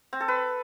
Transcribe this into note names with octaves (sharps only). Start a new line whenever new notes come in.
C4
A4
B4